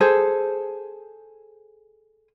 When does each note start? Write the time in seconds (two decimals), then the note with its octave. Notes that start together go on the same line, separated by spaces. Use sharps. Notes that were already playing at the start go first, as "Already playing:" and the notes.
0.01 G#4 A4 C5